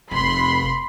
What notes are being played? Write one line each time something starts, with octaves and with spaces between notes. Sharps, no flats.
F1 B5 C6